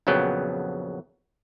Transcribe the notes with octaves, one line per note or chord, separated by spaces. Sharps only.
A#1 F2 C#3 F#3 B3 G5